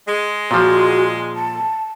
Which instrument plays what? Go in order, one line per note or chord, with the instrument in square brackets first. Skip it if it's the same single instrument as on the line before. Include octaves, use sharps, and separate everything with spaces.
[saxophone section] G#3
[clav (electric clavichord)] A#2 F3 [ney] F#4
[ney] A5